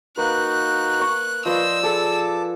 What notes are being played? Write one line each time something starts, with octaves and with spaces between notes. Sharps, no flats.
A#3 D#4 F#4 B4 F#6
C#6 D#6
F3 B4 C5 D5 D#5 C6 E6
G#4 A4 A5 D6